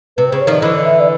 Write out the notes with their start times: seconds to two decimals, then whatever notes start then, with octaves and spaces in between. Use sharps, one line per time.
0.17 C3 B4
0.29 C5
0.32 C#3
0.40 C#5
0.47 D#3 F3 D5
0.62 D3 E3 D#5
0.84 E5
1.00 D5